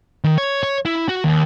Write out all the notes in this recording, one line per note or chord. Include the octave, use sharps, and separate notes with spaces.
D#3
C#5
C#5
E4
F#4
D#2